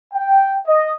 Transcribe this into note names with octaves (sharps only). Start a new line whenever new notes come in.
G5
D#5